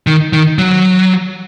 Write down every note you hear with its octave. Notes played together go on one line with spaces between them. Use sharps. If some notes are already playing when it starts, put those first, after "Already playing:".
D#3
D#3
F#3